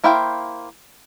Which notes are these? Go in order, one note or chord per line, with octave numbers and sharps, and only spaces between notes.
A#3 E4 C5 F5 G5